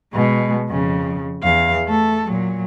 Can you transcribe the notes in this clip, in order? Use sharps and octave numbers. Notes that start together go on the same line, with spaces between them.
B2 G#3
F2 C#3
E2 F5
A3 A4
A#2 F#3